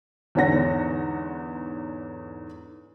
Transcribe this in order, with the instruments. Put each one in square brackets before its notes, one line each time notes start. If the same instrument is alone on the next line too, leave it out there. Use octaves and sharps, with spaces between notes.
[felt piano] E2 G#2 D3 C#5 F#5 A#6